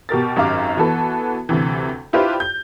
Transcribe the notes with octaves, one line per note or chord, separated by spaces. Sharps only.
B2 G4 A#4 A6
G#1 F#2 G4 F5 D6
E3 B3 F#4 A4 B4
D2 C3 E3
D4 E4 F4 G4 B4 C5
G6